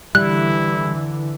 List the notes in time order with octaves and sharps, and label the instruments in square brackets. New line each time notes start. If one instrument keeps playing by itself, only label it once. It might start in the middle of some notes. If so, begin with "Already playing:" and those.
[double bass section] D3 E3 [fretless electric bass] G3 [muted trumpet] E4 [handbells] F#6